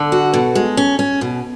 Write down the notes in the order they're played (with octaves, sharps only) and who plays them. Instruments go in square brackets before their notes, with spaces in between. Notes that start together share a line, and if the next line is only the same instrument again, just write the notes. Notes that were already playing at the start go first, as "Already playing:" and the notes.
Already playing: [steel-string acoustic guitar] D3 [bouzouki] A4
[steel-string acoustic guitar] F#4
B2
G#3
C#4
C#4
B2